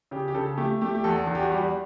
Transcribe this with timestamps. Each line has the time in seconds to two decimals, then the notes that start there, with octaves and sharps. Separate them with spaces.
0.11 C#3 G4
0.28 G4
0.35 C#3 A4
0.58 A3 G4
0.81 A3 G4
0.95 G4
1.04 E2 A4
1.27 E2
1.35 G4
1.43 F#4
1.51 G3 G4